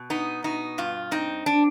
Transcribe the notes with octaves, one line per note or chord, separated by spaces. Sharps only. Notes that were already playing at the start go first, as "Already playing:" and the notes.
Already playing: B2
B3 D#4
B2 D#4
G2 F4
C4 D#4
D4